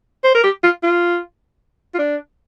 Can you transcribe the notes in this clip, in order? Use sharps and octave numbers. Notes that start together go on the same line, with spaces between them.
C5
A#4
G4
F4
F4
F4
D4